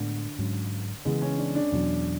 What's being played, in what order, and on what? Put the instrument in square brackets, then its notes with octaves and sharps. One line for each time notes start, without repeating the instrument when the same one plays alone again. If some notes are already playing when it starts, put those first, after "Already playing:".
Already playing: [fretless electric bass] A2 G#3 B3 [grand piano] D3
[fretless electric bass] G#2 F#3 C#4
[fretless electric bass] C#3 E3 B3 [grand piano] G#3
[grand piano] C#4
D4
D4
[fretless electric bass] E2 B2 F#3